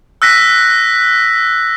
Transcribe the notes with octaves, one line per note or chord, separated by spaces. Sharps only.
E6 F#6 A#6 B6